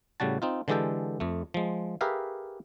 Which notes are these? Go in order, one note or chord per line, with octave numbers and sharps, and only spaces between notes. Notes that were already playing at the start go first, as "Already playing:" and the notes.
A2 C#3 G3 F#4 A5
C4 D#4 F4
D3 E3 G#3 G4 A4 G5
F2 A3
F3 G#3
G4 G#4 A#4 B4 E5 F5